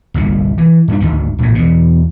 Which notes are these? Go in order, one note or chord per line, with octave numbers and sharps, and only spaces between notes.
G1 C2 A#2
E3
G2 D4
G#1 D2 D#3
A#1 A2
E2 B2